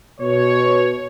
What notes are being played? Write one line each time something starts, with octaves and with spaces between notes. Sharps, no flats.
B2 C#5